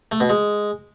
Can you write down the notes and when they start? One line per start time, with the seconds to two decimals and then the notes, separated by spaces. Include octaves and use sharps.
0.12 A3
0.20 B2
0.29 G#3